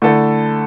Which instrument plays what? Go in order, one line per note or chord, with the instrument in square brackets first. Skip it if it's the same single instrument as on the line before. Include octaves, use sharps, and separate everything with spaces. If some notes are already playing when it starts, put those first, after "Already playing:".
[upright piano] D3 A3 E4 A4